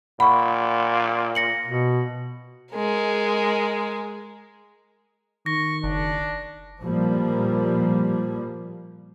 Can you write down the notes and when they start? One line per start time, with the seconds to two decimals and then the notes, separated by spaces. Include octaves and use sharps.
0.20 A#2 F#5 B5 C#6
1.35 A#6 C#7 F#7
1.67 B2
2.72 G#3 A#4
5.46 D#3 C#6 A#6
5.84 F#1 D4
6.81 A#2 F3 G3 A#3